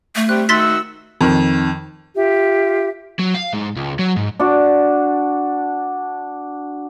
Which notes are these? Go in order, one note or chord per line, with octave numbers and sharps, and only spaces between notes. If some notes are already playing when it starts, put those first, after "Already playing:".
A3
G3 C4 G4 F#6
D#3 F#4 E5 C6 E6 A6 B6
F2 D#3
F4 G4 E5
F#3
F5
G#2
C#2
F#3
G#2
D4 F#4